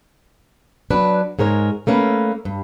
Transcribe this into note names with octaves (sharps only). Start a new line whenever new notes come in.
F#3 D4 B4
G#2 G#3 A#4 C#5
A3 A#3 C#4 B4
G2